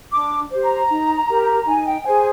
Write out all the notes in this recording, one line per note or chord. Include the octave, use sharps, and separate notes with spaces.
D4 D6
G4 C5
A#5
D#4
G4 A#4
D#4 G#5
G5
G#4 C5 G#5